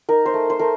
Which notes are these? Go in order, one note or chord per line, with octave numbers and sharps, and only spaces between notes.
D#4 A#4
C5
A3
C5
A3 A#4